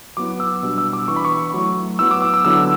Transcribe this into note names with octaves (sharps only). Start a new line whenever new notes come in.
F#3 B3 E4 D6
E6
B2 G3 D4
E6
D6
E3 B3 D4 C#6
B5
C#6
F#3 A3 E4
F#3 B3 E4 E6
D6
D6
E6
D3 F#3 B3 E4 E6